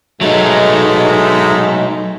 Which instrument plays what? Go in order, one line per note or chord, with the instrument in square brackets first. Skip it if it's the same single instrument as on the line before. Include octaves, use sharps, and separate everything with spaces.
[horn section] G#2 G#3 A3 [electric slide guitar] F#3 D#4